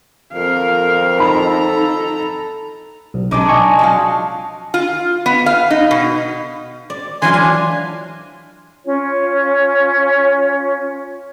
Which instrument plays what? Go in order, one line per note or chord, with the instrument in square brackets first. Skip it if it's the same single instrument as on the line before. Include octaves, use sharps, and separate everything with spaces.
[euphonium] F2 [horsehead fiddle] A#4 F5
[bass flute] D#4 [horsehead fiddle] A4 A#5 [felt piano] B5
[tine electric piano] B1
[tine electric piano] B1 D6 [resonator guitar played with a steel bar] G#3 D4 D#4
[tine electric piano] D#5 G#5 C#6
[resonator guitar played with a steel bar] F3 F#3 F5
F4
B3
F5
D#4
B2
[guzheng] D5
[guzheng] E3 F#3 F4 [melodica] G#5 C6
[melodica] D4 [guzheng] F5 G#5
[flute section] C#4 F4 C#5